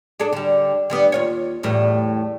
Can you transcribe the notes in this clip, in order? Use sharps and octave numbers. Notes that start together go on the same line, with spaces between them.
D4 G#4 A4
D3 G3
D3 G3 B3
D#2 F4 C#5
E2 A2 G3